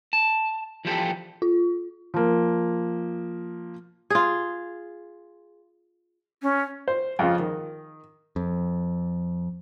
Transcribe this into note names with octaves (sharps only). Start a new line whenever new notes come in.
A5
E3 F3 G3 C4 G4 A4
F4
F3 A#3
F4 G#4
C#4
C5
F2 C#3 F3 F4
D#3
F2